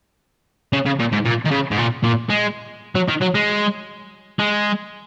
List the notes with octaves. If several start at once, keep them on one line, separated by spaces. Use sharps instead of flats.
C#3
C#3
A#2
G#2
A#2
D#3
C#3
G#2
A#2
A#2
G#3
F#3
D#3
F#3
G#3
G#3